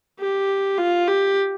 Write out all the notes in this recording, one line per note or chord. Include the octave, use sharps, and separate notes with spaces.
G4
F4
G4